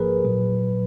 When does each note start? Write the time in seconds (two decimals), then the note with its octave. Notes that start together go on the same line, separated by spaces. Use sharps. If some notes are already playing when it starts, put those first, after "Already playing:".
Already playing: G#1 G#2 F3 A#3 G#4 A#4 B4
0.25 A#2 F#3